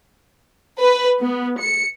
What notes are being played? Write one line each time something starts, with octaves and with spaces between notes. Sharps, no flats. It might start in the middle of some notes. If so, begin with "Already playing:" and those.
B4
B3
C#7